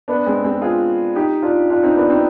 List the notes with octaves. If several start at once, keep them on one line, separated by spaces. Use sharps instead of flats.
B3 D4
G#3 C4
G#3 C4
F4 G#4
D#4 G4
D4 F4
D4 F4
C4 D#4
B3 D4
C4 D#4